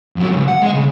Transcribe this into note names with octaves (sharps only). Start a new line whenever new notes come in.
F2 F#3
C#2 G2
F#5
G#3 D#5
C#3